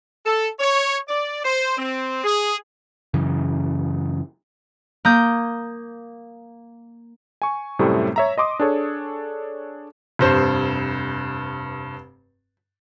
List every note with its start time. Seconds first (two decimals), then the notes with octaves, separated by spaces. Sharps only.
0.26 A4
0.60 C#5
1.09 D5
1.45 C5
1.78 C4
2.24 G#4
3.14 F#2 C#3 E3
5.05 A#3 D#6 G6
7.42 G#5 C#6
7.79 F#2 A2 C3 G3 A3 C4
8.16 C#5 E5 A#5
8.38 D#5 C6 D6 D#6
8.59 D4 G#4 A4 C#5
10.19 F1 G2 C5